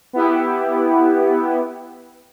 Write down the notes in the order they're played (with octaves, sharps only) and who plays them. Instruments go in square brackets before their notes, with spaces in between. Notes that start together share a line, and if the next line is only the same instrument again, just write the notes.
[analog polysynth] B3 E4 G4